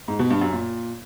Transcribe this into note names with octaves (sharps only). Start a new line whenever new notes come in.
G#2
B2
G2
F#2
A#2